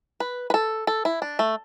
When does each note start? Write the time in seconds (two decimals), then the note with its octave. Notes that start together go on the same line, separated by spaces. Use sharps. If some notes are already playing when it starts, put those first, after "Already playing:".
0.20 B4
0.50 B4
0.54 A4
0.87 A4
1.05 E4
1.22 D4
1.39 A3